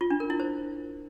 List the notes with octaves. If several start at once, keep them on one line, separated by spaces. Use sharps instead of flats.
F4
D4
A#4
E4
C5